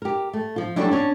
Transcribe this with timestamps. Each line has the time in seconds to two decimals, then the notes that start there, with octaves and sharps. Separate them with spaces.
0.02 G4 A#4
0.33 A3
0.56 F3 F4
0.76 F#3 G3 A3 C#4 D4 E4
0.91 C#4 D4